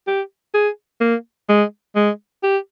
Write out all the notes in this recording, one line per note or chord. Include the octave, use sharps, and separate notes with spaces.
G4
G#4
A#3
G#3
G#3
G4